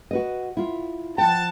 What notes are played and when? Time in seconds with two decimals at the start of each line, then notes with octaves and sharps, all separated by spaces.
0.11 F#4 B4 D#5
0.57 E4 F4
1.18 F3 F#5 G5 A5